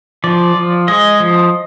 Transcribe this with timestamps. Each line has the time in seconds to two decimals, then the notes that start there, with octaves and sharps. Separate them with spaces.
0.24 F3 D5
0.56 F3
0.88 G#3 D#5
1.20 F3